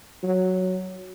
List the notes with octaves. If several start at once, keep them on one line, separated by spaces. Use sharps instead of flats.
F#3